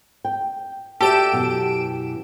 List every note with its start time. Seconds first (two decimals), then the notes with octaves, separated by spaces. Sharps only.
0.25 G5
1.01 F#4 G4 A4 D5 E5 D7 E7
1.32 F#2 B2 E3